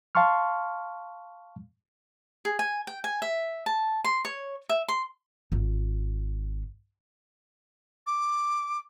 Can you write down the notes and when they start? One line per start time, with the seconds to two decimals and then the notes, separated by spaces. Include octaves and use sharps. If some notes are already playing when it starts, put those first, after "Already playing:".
0.15 F5 A5 C6 C#6 F6
2.45 G#4
2.59 G#5
2.87 G5
3.04 G#5
3.22 E5
3.66 A5
4.04 C6
4.25 C#5
4.69 E5
4.88 C6
5.52 G#1 F4
8.07 D6